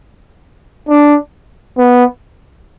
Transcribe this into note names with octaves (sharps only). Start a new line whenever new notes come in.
D4
B3